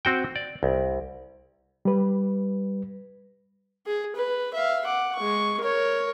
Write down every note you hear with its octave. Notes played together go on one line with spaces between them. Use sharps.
C4 F#4 G5
D5
C2
G3 B4
G#4
B4
E5 F5
F#5 D6
G#3 C#6
A#4 C#5